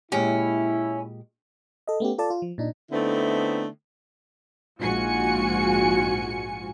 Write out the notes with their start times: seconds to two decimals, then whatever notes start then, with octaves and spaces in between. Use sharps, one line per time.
0.12 A#2 G#3 C#4 E4 G4
1.87 A4 D#5
2.00 A3 B3 C#4 G4
2.18 F4 A4 D5 A5
2.30 F4
2.42 F3
2.58 A#2 D4 D#4
2.92 D3 A3 B3 C4 D#4 E4
4.80 A#1 G#2 F4 F#4 G#5 C#7